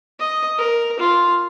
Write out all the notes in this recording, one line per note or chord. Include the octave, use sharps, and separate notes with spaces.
D#5
A#4
F4